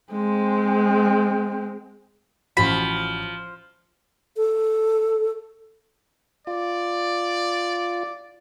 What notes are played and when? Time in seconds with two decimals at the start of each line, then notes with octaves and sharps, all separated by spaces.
0.12 G#3 C4
2.57 A1 F3 F#4 B5
4.37 A4
6.47 F4 D5